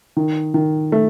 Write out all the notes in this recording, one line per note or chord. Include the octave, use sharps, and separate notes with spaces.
D#3
D#3
A3